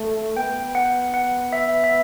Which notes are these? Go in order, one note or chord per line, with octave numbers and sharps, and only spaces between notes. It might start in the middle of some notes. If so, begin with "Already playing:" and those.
Already playing: A3
B3 G5
F#5
F#5
E5
E5